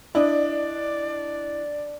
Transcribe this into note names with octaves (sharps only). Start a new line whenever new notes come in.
D4 E4 D5 D#5